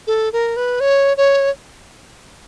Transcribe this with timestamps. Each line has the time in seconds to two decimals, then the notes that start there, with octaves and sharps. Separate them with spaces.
0.07 A4
0.33 A#4
0.57 B4
0.80 C#5
1.17 C#5